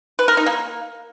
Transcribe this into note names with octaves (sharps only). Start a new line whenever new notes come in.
B4
A#4
D#4
A#3